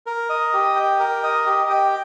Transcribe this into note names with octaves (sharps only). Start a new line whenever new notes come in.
A#4
D#5
G4
G5
A#4
D#5
G4
G5